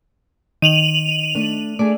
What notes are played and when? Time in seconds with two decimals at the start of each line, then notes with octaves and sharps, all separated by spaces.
0.62 D#3 D#7 F7 F#7
1.35 A3 D4
1.79 A3 D4 G#4 D5